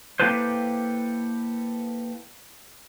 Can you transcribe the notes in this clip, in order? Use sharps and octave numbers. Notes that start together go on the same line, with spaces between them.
A#3 E4 G4 A4 B4 C5